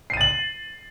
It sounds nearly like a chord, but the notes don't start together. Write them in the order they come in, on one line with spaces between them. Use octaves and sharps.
C7 D#7 A6 F#7